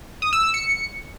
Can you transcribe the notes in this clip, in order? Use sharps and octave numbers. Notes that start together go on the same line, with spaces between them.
D#6
E6
E6
C#7